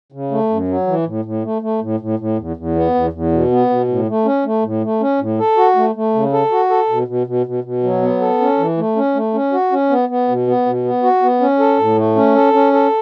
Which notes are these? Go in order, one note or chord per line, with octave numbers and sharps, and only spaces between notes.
C#3
A3
F#2
F#3
E3
A2
A2
A3
A3
A2
A2
A2
E2
E2
B3
E2
E2
B2
B3
B2
A2
A3
C#4
A3
A2
A3
C#4
A2
A4
F#4
A3
A3
C#3
A4
F#4
A4
B2
B2
B2
B2
B2
F#3
B3
A4
C#4
E3
A3
C#4
A3
C#4
F#4
C#4
B3
B3
B2
B3
B2
B3
F#4
B3
C#4
A4
A2
A3
C#4
A4
C#4
A4